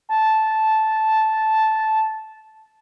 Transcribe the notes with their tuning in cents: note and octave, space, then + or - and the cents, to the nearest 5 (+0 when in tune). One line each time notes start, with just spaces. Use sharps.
A5 -10